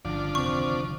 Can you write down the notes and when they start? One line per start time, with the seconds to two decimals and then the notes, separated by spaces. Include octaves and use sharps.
0.05 G1 C#3 F3 D4
0.35 F1 D2 D#3 C4 C#6